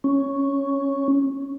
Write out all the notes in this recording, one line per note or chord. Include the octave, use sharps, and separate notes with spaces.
C#4